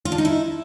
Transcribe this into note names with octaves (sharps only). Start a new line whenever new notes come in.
F4
D4
D#4
E4